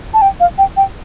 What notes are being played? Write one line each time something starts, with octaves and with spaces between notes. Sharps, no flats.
A5
G5
F5
G5
G5